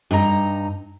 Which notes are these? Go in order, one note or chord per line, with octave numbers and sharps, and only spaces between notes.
G2 D#4 F4 A#5